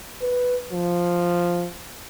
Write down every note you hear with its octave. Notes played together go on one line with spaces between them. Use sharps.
B4
F3